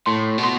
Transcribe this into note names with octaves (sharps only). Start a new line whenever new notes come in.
A2 C6
B2
C6